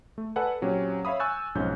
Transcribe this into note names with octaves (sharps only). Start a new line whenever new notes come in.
A3
A4 B4 D5 F#5 G#5
A#2 F#3 C4 C#4 G4
C#5 E5 F5 B5 D#6
G#5 C#6 E6 F#6 G6 A6
B1 F2 G#2 C#4 G6